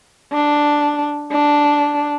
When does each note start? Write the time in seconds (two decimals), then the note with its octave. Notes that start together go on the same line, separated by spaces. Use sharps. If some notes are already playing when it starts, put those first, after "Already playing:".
0.33 D4
1.32 D4